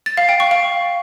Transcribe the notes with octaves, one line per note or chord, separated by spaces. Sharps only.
A6
F5
G5
C#6
F5